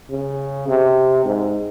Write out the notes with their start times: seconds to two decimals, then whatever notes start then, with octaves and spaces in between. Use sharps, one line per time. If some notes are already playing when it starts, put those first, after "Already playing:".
0.10 C#3
0.68 C3
1.25 G#2